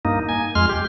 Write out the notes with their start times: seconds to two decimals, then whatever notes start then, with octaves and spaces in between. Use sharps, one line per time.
0.05 G2 A#3 D#4
0.29 G#5
0.55 F2 G#3 C6 F6
0.69 G4